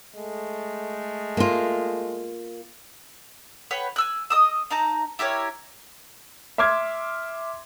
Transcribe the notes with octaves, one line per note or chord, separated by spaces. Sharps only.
G#3 A3
A#3 F4
B4 C#5 F#5 G5
G#5 E6 F#6
D#5 D#6 E6
D#4 A5 A#5
E4 G4 A#4 C#5
E5 C6 D6 F6 G#6